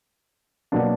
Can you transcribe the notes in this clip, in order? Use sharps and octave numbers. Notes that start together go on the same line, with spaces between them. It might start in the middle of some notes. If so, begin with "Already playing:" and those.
B2 F#3 A#3 D4